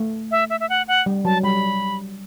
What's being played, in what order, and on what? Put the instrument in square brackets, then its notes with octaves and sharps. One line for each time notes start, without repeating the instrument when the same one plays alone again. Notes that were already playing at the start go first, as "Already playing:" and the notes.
Already playing: [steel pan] A3
[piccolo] E5
E5
E5
F#5
F#5
[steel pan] G3
[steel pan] F#3 [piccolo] A5
[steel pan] G3 [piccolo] B5